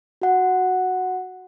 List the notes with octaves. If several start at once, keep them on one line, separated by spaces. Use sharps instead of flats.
F#4 F#5